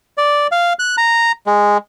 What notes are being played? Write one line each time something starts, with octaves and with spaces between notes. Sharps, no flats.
D5
F5
F#6
A#5
G#3